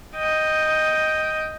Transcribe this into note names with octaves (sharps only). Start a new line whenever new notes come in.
D#5 G5